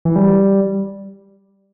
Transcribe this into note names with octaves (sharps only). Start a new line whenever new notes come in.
E3
G3